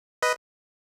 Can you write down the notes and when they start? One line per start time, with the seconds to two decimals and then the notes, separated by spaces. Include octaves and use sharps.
0.23 B4 D#5